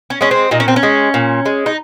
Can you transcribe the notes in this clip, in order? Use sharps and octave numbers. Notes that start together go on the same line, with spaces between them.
C#4
G#3 C#4
C4
A#2 D#4
C#4
C4
C#4
G#3
A#2
G#3
D#4